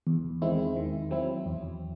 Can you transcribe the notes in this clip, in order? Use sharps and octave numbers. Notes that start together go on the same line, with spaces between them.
E2
D#3 G#3 C4 E4
D#3
F#3 C4 E4
E2